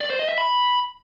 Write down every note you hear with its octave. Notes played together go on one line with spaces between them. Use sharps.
D5
C5
D#5
E5
B5